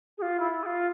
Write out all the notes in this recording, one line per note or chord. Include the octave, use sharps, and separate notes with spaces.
G#4
F4
E4
G#4
F4